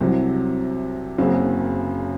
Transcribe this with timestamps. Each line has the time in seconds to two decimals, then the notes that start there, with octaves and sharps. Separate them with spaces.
0.01 C2 C3 F#3
1.18 F#1 F#2 C#3 F#3 C4